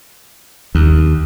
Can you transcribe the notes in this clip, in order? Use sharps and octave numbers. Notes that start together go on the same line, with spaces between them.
D#2